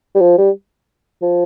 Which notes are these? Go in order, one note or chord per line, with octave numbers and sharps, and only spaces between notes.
G3
F3
G3
F3